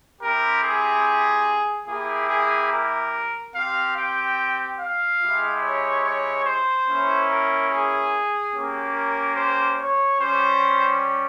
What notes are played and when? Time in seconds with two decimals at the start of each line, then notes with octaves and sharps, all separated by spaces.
0.21 C4 E4 G4 A#4
0.62 G#4
1.87 A#3 E4 G4 G#4
2.29 G#4
2.71 A#4
3.54 C4 G4 F5
3.96 G5
4.78 F5
5.21 G#3 E4 G4
5.62 C#5
6.03 C#5
6.45 C5
6.87 A#3 C#4 E4
7.29 A#4
7.70 G#4
8.53 A#3 C#4 G4
8.95 A#4
9.36 C5
9.78 C#5
10.19 G3 C#4 G4 C5